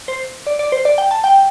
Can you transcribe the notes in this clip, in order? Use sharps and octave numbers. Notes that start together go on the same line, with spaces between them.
C5
D5
D5
C5
D5
G5
A5
G5